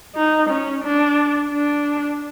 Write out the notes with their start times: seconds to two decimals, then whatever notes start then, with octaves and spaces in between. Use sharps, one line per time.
0.15 D#4
0.49 C#4
0.84 D4
1.52 D4